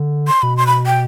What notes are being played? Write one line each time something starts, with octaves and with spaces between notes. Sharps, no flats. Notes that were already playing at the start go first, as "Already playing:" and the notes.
Already playing: D3
C6
B2 B5
C6
B5
G5